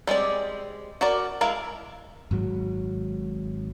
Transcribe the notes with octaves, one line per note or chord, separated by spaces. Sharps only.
G3 G#3 C4 D5
F#4 A#4 D5
G#3 E4 A#4 E5 F5
G#1 G#2 F#3